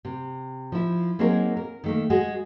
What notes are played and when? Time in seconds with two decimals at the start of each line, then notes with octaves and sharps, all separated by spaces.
0.05 C3
0.72 F3 E4
1.19 F#3 A#3 C4 D#4 G#4 A#4
1.57 A#4
1.84 D#3 A3 A#3
2.10 G#3 F#4 G#4